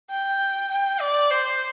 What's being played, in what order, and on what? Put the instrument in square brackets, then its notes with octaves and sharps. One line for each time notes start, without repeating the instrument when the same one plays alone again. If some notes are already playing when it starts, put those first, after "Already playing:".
[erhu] G5
G5
D5
C5